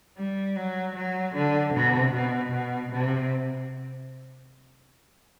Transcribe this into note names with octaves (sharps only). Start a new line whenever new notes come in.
G3
F#3
F#3
D3
C3
B2
B2
C3